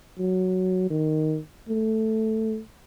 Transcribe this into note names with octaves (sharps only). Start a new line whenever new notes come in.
F#3
D#3
A3